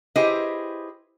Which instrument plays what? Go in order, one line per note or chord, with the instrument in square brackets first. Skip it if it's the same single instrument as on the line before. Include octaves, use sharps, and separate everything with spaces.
[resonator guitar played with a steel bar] E4 G4 G#4 B4 C5 D#5